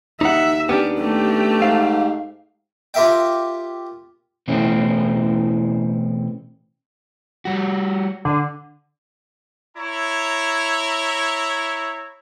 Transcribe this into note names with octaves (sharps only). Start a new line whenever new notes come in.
D#2 D#4 E5 F#5
B3 C#4 D4 G4
A3 G4
G#2 F5
F4 G4 A#4 E5 F5 G5
B2 E3 A3 C4 C#4 E4
G3 F#4
D3
E4 C#5 A#5